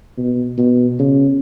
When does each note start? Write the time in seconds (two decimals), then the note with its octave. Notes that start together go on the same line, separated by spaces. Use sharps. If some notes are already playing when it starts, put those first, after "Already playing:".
0.18 B2
0.58 B2
0.99 C#3